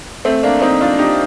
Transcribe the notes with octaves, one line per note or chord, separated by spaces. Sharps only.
A3 C4
A#3 D4
C4 D#4
D4 F4
D#4 G4